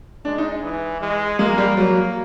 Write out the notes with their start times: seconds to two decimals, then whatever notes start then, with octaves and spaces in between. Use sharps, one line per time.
0.25 G#3 D4
0.38 D#4
0.63 E3
1.01 G#3
1.39 G#3 A#3
1.58 G3
1.77 F#3 A#3